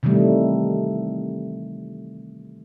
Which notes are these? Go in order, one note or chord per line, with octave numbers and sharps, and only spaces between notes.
C3 D#3 E3 G3 A3